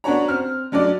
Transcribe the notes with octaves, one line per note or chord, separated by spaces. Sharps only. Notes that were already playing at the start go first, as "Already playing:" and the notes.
B3 D4 F#4 C#5 A#5
C4 F6
D3 F#3 D4 D5